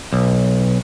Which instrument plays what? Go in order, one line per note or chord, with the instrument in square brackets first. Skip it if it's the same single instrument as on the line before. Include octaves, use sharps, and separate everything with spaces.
[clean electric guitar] B1